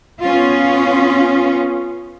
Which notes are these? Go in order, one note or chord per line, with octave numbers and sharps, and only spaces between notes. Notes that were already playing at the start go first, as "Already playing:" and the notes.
B3 C#4 F4